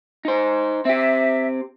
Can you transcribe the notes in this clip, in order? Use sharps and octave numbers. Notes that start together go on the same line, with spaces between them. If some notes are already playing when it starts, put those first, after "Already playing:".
D#4 C5
C4 G4 E5